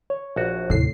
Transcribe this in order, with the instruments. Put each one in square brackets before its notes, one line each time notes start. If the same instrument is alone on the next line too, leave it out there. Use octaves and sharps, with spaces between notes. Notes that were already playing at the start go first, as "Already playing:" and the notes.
[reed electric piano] C#5
[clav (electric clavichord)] A#1 F#4
[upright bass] D#2 C3 [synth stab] A2 C7